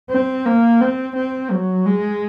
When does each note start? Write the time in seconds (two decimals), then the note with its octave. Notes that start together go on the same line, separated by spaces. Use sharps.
0.10 C4
0.46 A#3
0.81 C4
1.16 C4
1.51 F#3
1.86 G#3